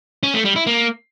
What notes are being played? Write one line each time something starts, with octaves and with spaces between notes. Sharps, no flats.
C#4
A3
G3
E4
A#3